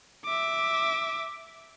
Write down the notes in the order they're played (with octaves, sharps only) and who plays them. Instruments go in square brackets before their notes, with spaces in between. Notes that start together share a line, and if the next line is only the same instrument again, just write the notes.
[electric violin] E5 D6